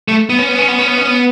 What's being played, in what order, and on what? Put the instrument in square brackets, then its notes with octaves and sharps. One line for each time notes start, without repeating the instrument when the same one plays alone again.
[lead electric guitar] A3
B3
C#4
B3
C#4
B3
C#4
B3
C#4
B3